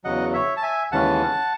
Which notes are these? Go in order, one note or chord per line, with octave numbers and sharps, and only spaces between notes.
E2 C#3 F#3 D#5 F#5
C#5 E5
A5
E5 G#5
D#2 C#3 E3 G#3 C#4 F#5 A5